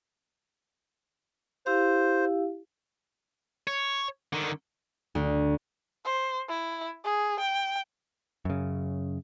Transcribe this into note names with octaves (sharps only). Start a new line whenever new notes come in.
E4 G4 C5 F5
C#5
D3 D#3
D2
C5
E4
G#4
G5
F#2 C#3